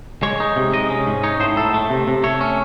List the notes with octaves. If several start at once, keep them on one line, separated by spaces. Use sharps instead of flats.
G#3 C#5
D#4
C3
G#3 D#5
C#4
G#2
D#4 C#5
A2 C5
A2 A4
A3
C3
C3
A3 C#5
C#4